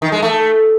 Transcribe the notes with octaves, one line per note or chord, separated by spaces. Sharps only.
D#3
G#3
A3